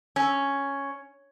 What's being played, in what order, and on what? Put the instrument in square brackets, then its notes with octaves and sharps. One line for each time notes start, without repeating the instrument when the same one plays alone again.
[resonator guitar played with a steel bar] C#4